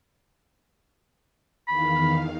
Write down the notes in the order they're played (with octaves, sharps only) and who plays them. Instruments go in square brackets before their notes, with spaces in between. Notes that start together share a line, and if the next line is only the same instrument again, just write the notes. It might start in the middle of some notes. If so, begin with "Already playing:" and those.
[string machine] E2 D#3 F5 [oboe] B5